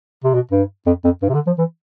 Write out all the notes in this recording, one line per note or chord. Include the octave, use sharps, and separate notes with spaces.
C3
B2
G2
F2
F2
G2
C3
D3
F3
E3